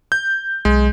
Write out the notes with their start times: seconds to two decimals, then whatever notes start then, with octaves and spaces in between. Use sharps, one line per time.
0.12 G6
0.65 B1 G#3